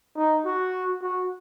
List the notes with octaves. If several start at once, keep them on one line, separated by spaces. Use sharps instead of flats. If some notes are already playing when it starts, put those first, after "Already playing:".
D#4
F#4
F#4